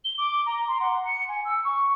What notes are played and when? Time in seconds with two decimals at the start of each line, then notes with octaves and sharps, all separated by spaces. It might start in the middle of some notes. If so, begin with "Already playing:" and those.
0.05 G7
0.18 D6
0.46 A#5
0.68 C6
0.80 F#5
1.05 C#7
1.29 G#5
1.45 E6
1.64 C#6